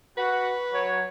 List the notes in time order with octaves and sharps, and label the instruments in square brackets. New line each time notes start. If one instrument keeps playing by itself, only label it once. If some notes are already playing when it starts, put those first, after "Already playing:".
[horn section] F#4 F#5 [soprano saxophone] B4
[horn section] F#3 C#5